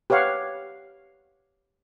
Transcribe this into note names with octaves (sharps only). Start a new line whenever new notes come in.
G4 B4 C#5 F5 F#5